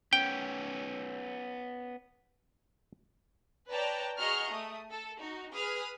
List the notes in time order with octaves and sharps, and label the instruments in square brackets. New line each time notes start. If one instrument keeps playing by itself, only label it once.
[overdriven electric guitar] B3 C#4 [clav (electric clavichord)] G5
[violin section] B4 C#5 D5 G5 A5 A#5
F#4 G#4 D#5 A#5 C#6 F6
A3 D#6
A4
D#4 F#4
G#4 B4 D#6 F6 B6